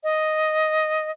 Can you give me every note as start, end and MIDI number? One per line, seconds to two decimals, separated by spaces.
0.04 1.11 75